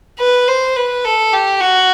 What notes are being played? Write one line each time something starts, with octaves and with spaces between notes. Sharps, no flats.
B4
C5
B4
A4
G4
F#4